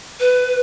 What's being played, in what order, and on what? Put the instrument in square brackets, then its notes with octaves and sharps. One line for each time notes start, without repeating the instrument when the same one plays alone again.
[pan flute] B4